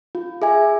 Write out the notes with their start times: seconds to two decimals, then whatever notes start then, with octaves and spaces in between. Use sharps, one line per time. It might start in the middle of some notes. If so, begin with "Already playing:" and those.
0.15 F4
0.42 G#4 E5 G#5